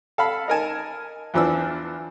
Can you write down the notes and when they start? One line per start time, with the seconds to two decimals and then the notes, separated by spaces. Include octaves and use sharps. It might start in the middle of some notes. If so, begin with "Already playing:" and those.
0.18 A4 F5 B5
0.48 D#4 A#4 G#5 A5
1.34 E2 E3 F3 D4 B4 E6